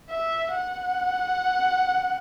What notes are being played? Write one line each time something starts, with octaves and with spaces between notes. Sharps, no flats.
E5
F#5